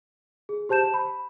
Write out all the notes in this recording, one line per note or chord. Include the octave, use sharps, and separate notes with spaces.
G#4
G4 C5 A5 G6 E7
B5